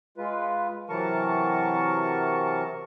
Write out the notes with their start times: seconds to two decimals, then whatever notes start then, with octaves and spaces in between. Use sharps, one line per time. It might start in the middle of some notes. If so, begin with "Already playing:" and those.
0.18 G#3 F4 B4
0.89 C3 E3 F#3 A#4 A5 C#6